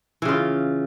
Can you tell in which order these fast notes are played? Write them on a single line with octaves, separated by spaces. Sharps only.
E3 C#3 F4